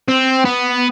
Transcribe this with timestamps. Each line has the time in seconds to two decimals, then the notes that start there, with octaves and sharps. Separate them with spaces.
0.08 C4
0.45 B3